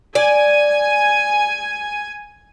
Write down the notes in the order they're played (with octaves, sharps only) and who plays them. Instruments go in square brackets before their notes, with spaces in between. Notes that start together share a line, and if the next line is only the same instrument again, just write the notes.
[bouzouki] D5 [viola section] G#5